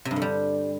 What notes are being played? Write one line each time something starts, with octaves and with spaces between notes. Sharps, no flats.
C3
G2
D3
G3